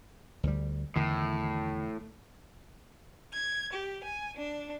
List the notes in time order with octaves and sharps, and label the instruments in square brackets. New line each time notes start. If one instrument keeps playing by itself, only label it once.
[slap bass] D2 G3
[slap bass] E2 D3 D#3 [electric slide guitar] A2
[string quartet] G#6
G4
G#5
D4